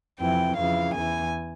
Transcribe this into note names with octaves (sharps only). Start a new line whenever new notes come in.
F2 C3 E3 G5
F2 C#3 E3 F5
E2 E3 G#5